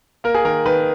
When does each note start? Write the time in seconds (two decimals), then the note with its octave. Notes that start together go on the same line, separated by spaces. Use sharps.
0.24 A#3 A#4
0.34 G#4
0.45 D#3 A#4
0.66 D#3 B4